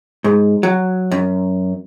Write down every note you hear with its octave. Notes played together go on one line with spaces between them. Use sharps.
G#2
F#3
F#2